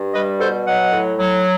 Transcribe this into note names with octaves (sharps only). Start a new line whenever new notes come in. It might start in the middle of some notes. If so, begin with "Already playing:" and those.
Already playing: G2
G3 B4 D#5
B2 A4 C5
F#3 D#5 F#5
A2
F#3